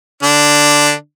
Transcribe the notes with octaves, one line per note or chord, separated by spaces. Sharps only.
D3 D4